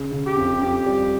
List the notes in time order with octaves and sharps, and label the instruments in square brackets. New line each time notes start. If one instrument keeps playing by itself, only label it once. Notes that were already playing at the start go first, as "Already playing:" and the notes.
Already playing: [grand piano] C#3
C#3
[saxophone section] G4
[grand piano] F2
[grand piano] F2 [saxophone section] G4
[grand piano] G3